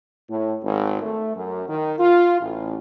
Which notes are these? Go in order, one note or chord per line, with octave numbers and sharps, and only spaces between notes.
A2
G#1
A3
F#2
D#3
F4
A1